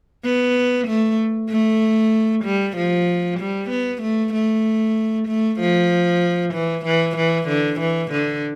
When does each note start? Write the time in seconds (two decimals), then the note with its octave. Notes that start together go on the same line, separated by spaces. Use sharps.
0.24 B3
0.87 A3
1.49 A3
2.44 G3
2.76 F3
3.39 G3
3.70 B3
4.02 A3
4.33 A3
5.27 A3
5.59 F3
6.53 E3
6.85 E3
7.16 E3
7.48 D3
7.80 E3
8.11 D3